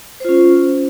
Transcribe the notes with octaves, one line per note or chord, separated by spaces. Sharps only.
C#4 F4 C5